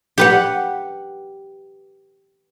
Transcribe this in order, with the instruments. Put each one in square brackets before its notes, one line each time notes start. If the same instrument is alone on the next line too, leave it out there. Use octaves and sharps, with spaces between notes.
[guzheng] G4 B4 F#5